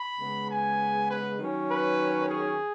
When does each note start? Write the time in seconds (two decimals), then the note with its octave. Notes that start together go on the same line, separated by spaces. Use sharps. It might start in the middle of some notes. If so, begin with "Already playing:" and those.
Already playing: B5
0.18 C#3 G#3 B3
0.48 G#5
1.08 B4
1.38 D#3 F#3 C#4
1.68 B4
2.27 G#4